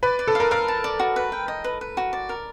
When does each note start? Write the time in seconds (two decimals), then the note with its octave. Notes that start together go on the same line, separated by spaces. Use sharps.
0.03 B4 D5
0.19 D5
0.28 A4
0.35 F5
0.40 A#4
0.51 A#4 F5
0.68 A5
0.84 D5
0.99 F#4
1.16 B4
1.32 G5
1.48 D#5
1.64 B4
1.81 B4
1.97 F#4
2.13 D5
2.29 A#4